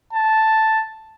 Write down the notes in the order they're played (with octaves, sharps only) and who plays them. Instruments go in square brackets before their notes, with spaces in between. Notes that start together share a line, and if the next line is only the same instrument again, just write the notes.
[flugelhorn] A5